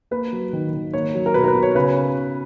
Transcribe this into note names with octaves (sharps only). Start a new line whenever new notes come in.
A#3 B4
F#3
D#3
D#3
A#3 C#5
F#3
A#4
B2 B4
A#4
B4
B2
C#5
C#3 B4